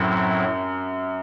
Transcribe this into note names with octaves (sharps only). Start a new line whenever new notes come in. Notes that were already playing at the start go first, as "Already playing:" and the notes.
Already playing: F#2 A2 F#3 C4 E4